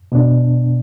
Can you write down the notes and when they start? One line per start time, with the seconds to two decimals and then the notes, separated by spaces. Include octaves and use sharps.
0.12 B2 B3 D4